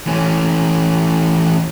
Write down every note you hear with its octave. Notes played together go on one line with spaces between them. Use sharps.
E3 C#4